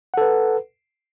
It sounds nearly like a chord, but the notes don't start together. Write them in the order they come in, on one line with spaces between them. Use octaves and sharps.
F#5 A4 B4